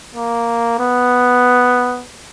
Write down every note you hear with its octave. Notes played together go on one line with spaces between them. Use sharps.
A#3
B3